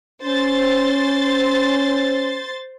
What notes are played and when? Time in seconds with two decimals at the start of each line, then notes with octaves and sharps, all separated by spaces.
0.24 C#4 C5 C6 A6